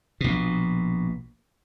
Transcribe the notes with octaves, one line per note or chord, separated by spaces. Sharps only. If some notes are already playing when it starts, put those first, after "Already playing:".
A#1 B2